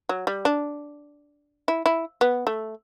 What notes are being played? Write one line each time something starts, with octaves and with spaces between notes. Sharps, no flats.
F#3
G3
D4
E4
E4
B3
A3